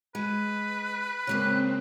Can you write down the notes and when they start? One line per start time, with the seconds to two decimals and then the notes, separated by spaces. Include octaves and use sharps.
0.15 G#3 B4
1.27 C#3 G#3 A#3 C4 F#6